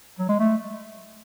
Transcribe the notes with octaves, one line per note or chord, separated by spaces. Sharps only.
F#3
G#3
A3